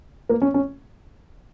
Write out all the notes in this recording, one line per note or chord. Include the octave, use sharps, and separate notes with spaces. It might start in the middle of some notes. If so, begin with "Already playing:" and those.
A#3
C#4
C#4